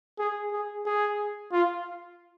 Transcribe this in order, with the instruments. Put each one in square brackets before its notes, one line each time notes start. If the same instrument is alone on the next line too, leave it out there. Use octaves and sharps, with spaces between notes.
[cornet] G#4
G#4
G#4
F4